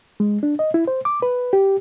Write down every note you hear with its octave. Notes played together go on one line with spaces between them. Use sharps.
G#3
D4
D#5
E4
C5
D6
B4
G4